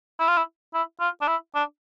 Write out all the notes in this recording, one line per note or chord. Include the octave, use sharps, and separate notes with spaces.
E4
F4
E4
E4
F4
D4
E4
D4